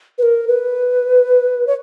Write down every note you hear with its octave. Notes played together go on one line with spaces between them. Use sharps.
B4
A#4
B4
C#5